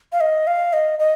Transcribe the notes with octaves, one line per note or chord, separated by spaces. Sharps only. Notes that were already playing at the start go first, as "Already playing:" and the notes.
F5
D#5
F5
D#5
D#5